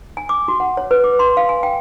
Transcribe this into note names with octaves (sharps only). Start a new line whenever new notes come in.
G#5
D6
F#4
F#5
C#5
B4
D6
C6
F5
G#5
G5